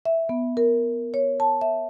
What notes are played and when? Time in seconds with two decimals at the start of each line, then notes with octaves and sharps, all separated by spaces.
0.05 E5
0.29 B3
0.57 A#4
1.14 C#5
1.40 A5
1.61 E5